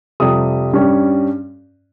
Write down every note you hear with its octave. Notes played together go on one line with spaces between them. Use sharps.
F2 C3 G3 D#6
G2 G3 C#4